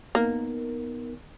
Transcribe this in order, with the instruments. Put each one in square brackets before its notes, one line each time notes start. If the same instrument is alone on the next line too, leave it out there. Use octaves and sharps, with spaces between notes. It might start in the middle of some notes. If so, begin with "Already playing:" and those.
[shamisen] A#3 [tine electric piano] B3 D#4 A#4